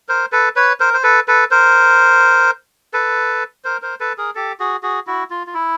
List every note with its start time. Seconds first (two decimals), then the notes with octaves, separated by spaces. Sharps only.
0.09 A#4 C5
0.32 A4 B4
0.56 B4 C#5
0.80 A#4 C5
0.94 C5
1.03 A4 B4
1.28 A4 B4
1.51 A#4 C5
2.94 A4 B4
3.64 A#4 C5
3.82 A#4 C5
4.00 A4 B4
4.18 G#4 A#4
4.35 G4 A4
4.60 F#4 G#4
4.83 F#4 G#4
5.07 E4 F#4
5.30 F4
5.47 F4
5.54 E4